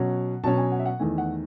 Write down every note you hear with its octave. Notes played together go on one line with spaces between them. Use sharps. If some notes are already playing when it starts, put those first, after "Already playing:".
Already playing: B2 F#3 C#4 F#5
B2 F#3 C#4 A5
G#5
F#5
E5
F#5
E2 D#3 A3 G#5
F#5